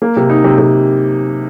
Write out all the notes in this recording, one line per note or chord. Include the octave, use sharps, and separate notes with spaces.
A#3
C3
D#4
C3
C3